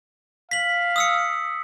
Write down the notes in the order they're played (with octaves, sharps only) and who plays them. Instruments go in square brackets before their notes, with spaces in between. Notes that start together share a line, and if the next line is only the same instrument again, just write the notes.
[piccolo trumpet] F5 [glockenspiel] B6 F#7
[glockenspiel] D#6 E6 C#7